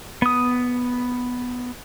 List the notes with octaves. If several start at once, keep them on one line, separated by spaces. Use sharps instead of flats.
B3 D#6